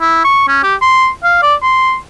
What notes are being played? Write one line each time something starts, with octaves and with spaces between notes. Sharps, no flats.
E4
C#6
C#4
G4
C6
F5
D5
C6